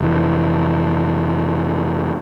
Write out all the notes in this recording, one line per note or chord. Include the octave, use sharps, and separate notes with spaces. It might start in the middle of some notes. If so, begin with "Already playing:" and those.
F1 E3